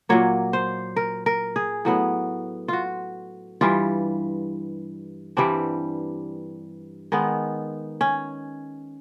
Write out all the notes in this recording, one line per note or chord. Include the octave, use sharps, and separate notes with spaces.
A#2 F#3 A#3 C#5
C5
A#4
A#4
G#4
A2 F#3 B3
F4 F#4
G2 E3 G3 F4
G2 E3 G3 C4 D4
D#3 G#3 B3
C#4